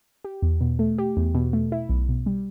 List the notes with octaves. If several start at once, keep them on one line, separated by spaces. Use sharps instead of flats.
G4
E2
B2
A3
G4
E2
B2
A3
E4
B1
B2
G3